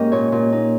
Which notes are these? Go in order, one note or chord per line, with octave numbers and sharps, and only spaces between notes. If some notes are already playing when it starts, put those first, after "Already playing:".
Already playing: G#2 A#3 C#4 G4 A#4 D#5
A#2 C#5
A#2
D#4